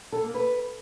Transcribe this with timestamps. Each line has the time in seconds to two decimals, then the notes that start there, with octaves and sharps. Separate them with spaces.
0.12 A4
0.23 A#3
0.34 B4